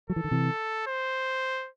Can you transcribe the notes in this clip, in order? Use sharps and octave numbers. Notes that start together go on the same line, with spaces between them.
F#3 A4
E3
D#3
C3 E3
C5